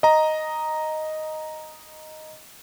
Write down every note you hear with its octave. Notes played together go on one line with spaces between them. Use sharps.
D#5 A#5